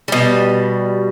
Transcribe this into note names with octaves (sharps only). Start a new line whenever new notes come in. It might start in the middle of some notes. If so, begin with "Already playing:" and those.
B2 G3